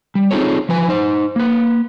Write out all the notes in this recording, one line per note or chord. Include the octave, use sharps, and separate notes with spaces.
G3
C4 D#4 F4 G#4 A4 C#5
F3 B4 G#5
D#4 C5
A#3 B4